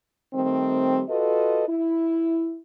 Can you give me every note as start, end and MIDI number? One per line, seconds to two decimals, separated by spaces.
0.34 1.02 51
0.34 1.02 55
0.34 1.02 57
0.34 1.02 60
1.09 1.63 65
1.09 1.63 66
1.09 1.63 69
1.09 1.63 71
1.09 1.63 75
1.67 2.59 64